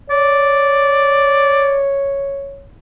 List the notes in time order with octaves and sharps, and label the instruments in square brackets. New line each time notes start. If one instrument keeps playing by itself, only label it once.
[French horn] C#5 [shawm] D5